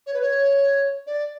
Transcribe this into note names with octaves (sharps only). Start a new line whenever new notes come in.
C#5
B4
C#5
D5